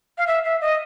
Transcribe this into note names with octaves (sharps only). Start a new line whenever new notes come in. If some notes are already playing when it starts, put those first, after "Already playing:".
F5
E5
E5
D#5